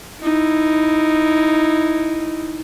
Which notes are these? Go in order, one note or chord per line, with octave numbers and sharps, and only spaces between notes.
D#4 E4